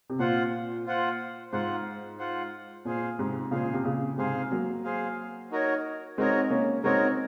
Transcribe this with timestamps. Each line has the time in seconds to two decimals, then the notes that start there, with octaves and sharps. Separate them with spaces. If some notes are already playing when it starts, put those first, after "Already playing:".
0.10 C3
0.19 A#2 F4 C5 F#5
0.86 F4 C5 F#5
1.52 G#2 F4 C5 F#5
2.19 F4 C5 F#5
2.85 A#2 G#4 C5 F5
3.19 G#2 C3
3.51 A#2 C#3 G#4 C5 F5
3.74 C3
3.85 A#2 C#3
4.18 G#2 C3 G#4 C5 F5
4.51 F#3 A#3
4.84 G#4 C5 F5
5.51 D#4 F#4 A#4 C#5
6.18 G#3 C4 D#4 F#4 A#4 C#5
6.50 A#3 C#4
6.84 G#3 C4 D#4 F#4 A#4 C#5